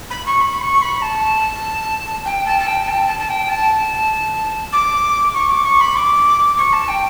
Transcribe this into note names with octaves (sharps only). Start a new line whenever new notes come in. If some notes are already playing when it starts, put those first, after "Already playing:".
B5
C#6
B5
C#6
B5
A5
G5
A5
A5
G5
A5
A5
A5
G5
A5
D6
C#6
D6
C#6
B5
D6
C#6
A5
G5